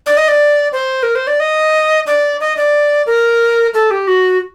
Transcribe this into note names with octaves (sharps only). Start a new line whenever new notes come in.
D5
D#5
D5
C5
A#4
C5
D5
D#5
D5
D#5
D5
A#4
A4
G4
F#4